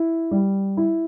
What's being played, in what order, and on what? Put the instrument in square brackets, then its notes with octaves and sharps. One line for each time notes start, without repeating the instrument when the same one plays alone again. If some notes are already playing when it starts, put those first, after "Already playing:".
Already playing: [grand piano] E4
G3
E4